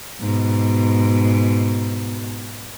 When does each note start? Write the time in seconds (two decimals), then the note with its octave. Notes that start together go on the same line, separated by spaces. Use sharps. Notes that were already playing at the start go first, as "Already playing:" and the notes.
0.20 G#2 B2